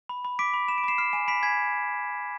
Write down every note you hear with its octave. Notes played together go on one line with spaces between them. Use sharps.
B5
B5
D6 B6 D7
B5
B5 E7
D7
B5 C7 E7
F6 C7 E7
G#5 C7 E7
B5 B6 D7
G#5 G#6 B6